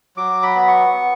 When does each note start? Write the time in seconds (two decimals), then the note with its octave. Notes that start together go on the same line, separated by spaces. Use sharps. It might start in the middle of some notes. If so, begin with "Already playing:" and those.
0.17 F#3 D6
0.43 B5
0.55 B3 B5
0.68 C#6
0.94 B3